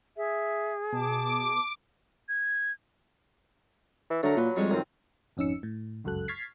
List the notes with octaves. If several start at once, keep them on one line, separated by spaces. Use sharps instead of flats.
G#4 E5
B2 A5 D6
G#6
E3
D3 F#3 A3 A#4
A#2 B4
F2 G3 G#3 C#4
F#2 D#3 C4
G#1 F2 C#4 D#4 E6 C#7
A2
G1 C#2 F#2 F#4 A4 F#6
C#6 F6 G#6 A6 B6 C7